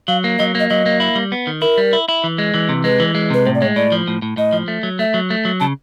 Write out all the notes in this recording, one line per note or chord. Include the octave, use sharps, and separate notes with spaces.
F#3 F5
A#3
F#3 D#5
A#3 D#5
F#3 D#5
A#3
E4
G3
B3
D#3
E4 A#4
G3
E4
E4
E3
G#3
E3
C3
G#3 B4
E3
G#3
C3 B4
A2 C5
D5
G#3 C#5
A2 D5
F3
A2
A2
A2 D#5
F3
A3
F#3
A3 E5
F#3
A3
F#3
C#3 A5